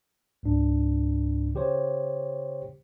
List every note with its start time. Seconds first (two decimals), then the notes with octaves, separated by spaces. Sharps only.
0.43 C#2 G#2 D4
1.55 C#3 G4 C5 C#5